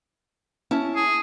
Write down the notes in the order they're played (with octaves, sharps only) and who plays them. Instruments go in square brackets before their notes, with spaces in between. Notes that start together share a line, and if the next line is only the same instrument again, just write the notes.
[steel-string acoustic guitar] C#4 E4 A5
[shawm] G#4